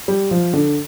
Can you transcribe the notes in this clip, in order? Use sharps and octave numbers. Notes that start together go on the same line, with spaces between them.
G3
F3
D3